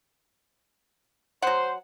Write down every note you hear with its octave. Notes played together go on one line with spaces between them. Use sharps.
F#3 C5 F#5